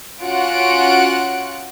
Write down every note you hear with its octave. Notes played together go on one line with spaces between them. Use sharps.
C#4 F4 F#4 F#5 F#6 D7